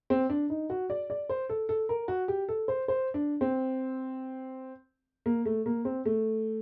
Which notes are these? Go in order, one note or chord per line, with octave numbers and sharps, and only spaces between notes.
C4
D4
D#4
F#4
D5
D5
C5
A4
A4
A#4
F#4
G4
A4
C5
C5
D4
C4
A#3
A3
A#3
C4
A3